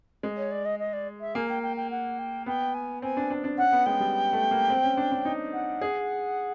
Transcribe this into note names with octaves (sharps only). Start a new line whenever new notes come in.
G#3
C#5
D5
D#5
D#5
D5
E5
A#3 G#5
G5
G5
G5
F#5
G5
B3 G5
G#5
C4 G#5
D4
D4
D4
C#4 F#5
B3
G#3 G5
G3
A3
A#3
C4
C#4
D4
D4
D#4
F#5
G#4